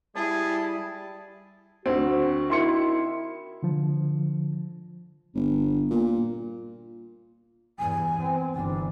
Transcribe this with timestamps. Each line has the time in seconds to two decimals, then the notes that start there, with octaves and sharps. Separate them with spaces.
0.16 G3 E4 G#4 A5
1.86 D2 C4 F#4
2.50 D#3 E4 E5 C6 C#7
3.63 D3 F3
5.35 G1
5.91 A#2
7.79 E2 G2 G#5
8.21 C4
8.55 G1 E3 D4